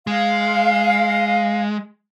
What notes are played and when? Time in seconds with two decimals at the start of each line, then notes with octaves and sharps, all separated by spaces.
0.07 G#3 F5